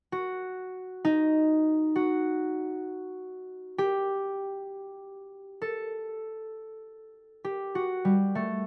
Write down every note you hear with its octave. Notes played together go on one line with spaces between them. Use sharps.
F#4
D#4
F#4
G4
A4
G4
F#4
G3
A3